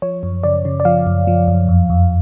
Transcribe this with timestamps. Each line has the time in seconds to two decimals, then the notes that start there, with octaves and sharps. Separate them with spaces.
0.02 F3 C#5
0.23 F#2
0.43 C#3 D5
0.65 C#3
0.80 D5
0.85 F3 F5
1.06 F#2
1.27 F3
1.48 F#2
1.68 F2
1.90 F2